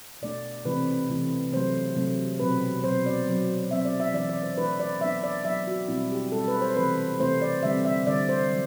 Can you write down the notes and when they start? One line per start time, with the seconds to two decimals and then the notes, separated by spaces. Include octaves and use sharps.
0.22 B2 A3 D4 D5
0.65 C3 E3 A3 C4 B4
1.09 C3 E3 A3 C4
1.52 C3 F#3 A3 C5
1.96 C3 F#3 A3
2.40 B2 F#3 C4 B4
2.83 B2 F#3 C4 C5
3.06 D5
3.28 F#3 C4
3.71 F#3 C4 E5
3.85 D5
4.00 E5
4.14 E3 A3 D4 D5
4.29 D5
4.43 C5
4.58 E3 A3 D4 B4
4.80 D5
5.01 F#3 B3 D4 E5
5.23 D5
5.45 F#3 B3 D4 E5
5.67 F#4
5.88 B2 G3 C4 E4
6.11 G4
6.32 B2 G3 C4 A4
6.48 B4
6.61 C5
6.76 C3 E3 A3 C4 B4
7.19 C3 E3 A3 C4 C5
7.42 D5
7.63 D3 G3 C4 E5
7.85 E5
8.07 D3 G3 C4 D5
8.29 C5
8.51 F#3